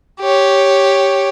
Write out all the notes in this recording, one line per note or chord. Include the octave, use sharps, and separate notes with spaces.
G4 C#5